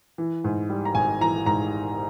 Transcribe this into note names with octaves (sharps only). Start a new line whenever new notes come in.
E3
G#2
G3
A#5
G#1 G#5
E3 A#5
G#2 A#5